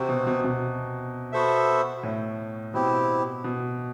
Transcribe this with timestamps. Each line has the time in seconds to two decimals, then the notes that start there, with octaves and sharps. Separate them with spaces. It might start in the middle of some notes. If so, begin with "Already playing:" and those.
Already playing: C3 C4 F#4 C5
0.09 B2
0.27 B2
0.44 B2
1.32 B3 F#4 A4 C5 E5
2.03 A2
2.74 B2 C4 E4 G4
3.44 B2